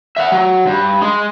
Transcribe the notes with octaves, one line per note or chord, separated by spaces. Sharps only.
E5 F#5
F#3
G2
G#3